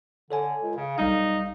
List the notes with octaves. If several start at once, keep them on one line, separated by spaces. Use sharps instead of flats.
D3 A4 C#5 G#5
C#2
C#3
B1 G3 D#4 F5